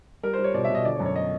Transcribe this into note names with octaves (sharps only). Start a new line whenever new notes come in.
G3 A#4
C5
G3 C#5
B2 D5
E5
B2 D#5
D3 D5
C#5
F#2
C#5
D#5